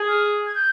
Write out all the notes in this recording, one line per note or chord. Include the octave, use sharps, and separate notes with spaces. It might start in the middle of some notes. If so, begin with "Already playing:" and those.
Already playing: G#4
F6
G#6
G6